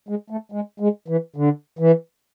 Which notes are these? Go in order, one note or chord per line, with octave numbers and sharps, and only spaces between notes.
G#3
A3
G#3
G#3
E3
D3
E3